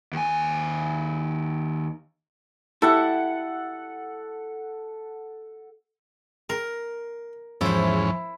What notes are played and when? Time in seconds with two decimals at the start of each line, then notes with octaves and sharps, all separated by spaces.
0.13 D#2 G#5
2.82 E4 G4 A4 F#5
6.49 A#4 C6
7.61 E2 G#2 F3 C#4 E4 C5